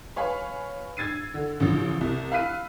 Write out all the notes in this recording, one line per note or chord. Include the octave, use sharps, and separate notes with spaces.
B4 C#5 F5 G#5 B5
E6 G#6 A6 C7 D#7
D3
A1 C#3 F3
C2 C3
F5 B5 E6 F#6 B6 D#7